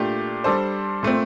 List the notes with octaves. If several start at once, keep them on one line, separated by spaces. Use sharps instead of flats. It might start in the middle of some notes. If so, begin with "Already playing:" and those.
Already playing: A#2 A3 D4 G4
G3 D4 A4 C5
A#2 A3 C4